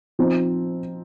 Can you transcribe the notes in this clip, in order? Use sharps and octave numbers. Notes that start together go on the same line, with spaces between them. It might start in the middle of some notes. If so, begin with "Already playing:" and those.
F3 C4 D#4